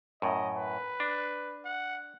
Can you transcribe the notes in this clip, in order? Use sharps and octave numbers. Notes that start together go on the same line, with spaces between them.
F#2 A2 D#5
B4
D4
F#5